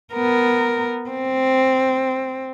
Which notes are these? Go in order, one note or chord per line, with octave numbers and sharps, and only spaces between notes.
B3 A#4
C4